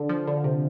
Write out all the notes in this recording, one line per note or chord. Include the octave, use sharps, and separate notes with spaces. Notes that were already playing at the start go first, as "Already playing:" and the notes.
Already playing: D3
F3
D3
C3